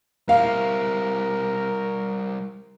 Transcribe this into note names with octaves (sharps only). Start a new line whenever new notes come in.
G3 E4 A#4 F5